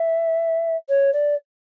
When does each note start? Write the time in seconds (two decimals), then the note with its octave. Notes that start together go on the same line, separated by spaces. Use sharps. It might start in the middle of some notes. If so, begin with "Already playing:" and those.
Already playing: E5
0.89 C#5
1.13 D5